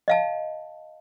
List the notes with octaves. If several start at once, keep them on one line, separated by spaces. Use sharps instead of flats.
D#5 F5 A5